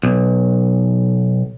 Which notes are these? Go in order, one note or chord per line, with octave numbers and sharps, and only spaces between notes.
B1